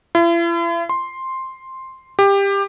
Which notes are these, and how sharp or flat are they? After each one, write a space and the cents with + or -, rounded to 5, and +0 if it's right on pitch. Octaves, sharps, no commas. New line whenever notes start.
E4 +45
C6 +5
G4 +20